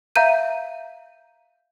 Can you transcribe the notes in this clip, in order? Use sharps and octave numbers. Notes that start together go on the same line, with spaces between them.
E5 F5 A#5 G6 D#7